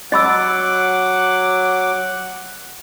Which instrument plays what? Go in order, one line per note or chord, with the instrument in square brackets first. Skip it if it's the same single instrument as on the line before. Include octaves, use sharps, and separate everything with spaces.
[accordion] F#3 D6 [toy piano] D#5 B5 E6 [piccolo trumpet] F#5